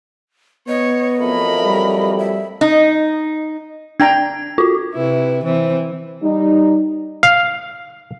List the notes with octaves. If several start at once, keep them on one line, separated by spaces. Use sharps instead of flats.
B3 C#5 D#5
F2 F#3 A3 A#4 B5
G3
E5
D#4
D4 G5 A#5 G#6
F4 F#4
C3 E4 B4
E3 C4 C5
G3 D#4
F5